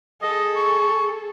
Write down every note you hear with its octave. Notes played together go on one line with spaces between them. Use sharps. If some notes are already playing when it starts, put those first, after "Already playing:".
G#4 A4 D#5
C#6